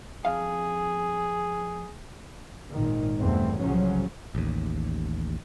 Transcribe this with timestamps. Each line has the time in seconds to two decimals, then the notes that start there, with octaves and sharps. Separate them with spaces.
0.25 F2 G#4 F5
2.71 G#1 A#2 D#3
3.19 E2 G2 B2 A3 C4
3.59 C2 A2 C#3 F3 F#3 C#4
4.35 A1 D#2